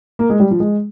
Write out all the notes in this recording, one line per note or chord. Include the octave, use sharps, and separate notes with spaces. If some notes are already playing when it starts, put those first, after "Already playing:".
A#3
G#3
G3
F3
G#3